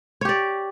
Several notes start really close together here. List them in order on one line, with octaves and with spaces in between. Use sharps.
C#5 G4 D5